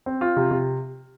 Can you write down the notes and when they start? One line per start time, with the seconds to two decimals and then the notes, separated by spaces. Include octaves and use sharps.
0.06 C4
0.21 F4
0.37 C3
0.51 C3